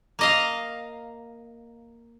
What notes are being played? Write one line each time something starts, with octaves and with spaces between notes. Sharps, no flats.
A#3 D#5 F5